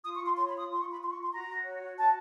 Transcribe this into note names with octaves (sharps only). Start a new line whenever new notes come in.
F4 D#6
C#6
F4 C6
C#5 C6
B5
F4 D#6
F4 C6
C#6
F4
B5
F4 C6
C#6
F4
C6
F#4 A#5
F#4
C#5
F#4
F#4 A5